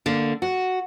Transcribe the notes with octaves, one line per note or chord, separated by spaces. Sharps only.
D3 A#3
F#4